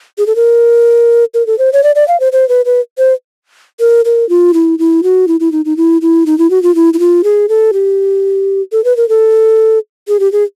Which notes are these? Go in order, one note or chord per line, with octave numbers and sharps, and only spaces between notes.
G#4
A4
A#4
A#4
A4
C5
C#5
D5
D5
F5
C5
C5
B4
B4
C5
A#4
A#4
F4
E4
E4
F#4
E4
E4
D#4
D#4
E4
E4
D#4
E4
F#4
F4
E4
E4
F4
G#4
A4
G4
A4
B4
A#4
A4
G#4
G4
G#4